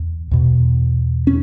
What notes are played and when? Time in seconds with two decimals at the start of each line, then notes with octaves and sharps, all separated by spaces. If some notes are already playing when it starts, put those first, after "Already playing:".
Already playing: E2
0.31 E2 B2
1.27 C#4